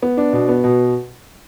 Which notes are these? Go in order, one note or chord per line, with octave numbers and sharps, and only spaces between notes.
B3
D4
B2
B3
B2